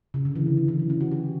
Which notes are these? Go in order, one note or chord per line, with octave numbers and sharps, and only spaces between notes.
C#3
D3
E3
C#3
C#3
E3
F#3
C#4
F#4
G4